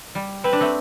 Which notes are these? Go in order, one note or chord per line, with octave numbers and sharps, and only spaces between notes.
G3
C4 B4
D4
A3 C4